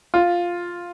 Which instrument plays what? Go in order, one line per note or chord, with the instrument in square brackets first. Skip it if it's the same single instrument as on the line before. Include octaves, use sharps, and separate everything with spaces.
[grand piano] F4